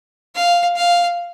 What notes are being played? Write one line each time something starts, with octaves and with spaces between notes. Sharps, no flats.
F5
F5